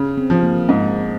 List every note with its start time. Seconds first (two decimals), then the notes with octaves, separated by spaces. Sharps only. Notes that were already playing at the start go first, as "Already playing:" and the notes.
Already playing: C#3
0.17 C4
0.30 F3
0.43 A#3
0.68 G#2 G#3